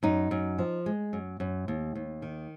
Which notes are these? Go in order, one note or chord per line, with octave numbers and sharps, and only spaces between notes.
F#2 D#4
F#2
F3
G#3
F#2
F#2
D#2
D#2
D#3